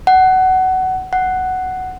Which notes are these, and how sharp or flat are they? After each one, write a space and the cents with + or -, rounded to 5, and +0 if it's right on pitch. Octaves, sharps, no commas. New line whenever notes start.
F#5 +20
F#5 +5